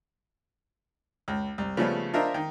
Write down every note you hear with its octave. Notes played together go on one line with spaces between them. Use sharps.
C#2
C2
C#3 F3 G3 A3 B3
D4 F4 A#4 C5 D#5 E5
D#3